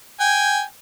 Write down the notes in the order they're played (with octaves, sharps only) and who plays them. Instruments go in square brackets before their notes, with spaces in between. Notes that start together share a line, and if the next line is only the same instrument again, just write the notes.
[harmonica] G5 G#5